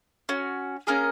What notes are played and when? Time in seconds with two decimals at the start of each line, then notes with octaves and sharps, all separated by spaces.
0.29 C#4 F#4
0.87 A#3 C#4 G#4 A#4